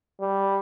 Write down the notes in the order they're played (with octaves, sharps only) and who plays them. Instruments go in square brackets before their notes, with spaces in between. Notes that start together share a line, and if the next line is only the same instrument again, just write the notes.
[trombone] G3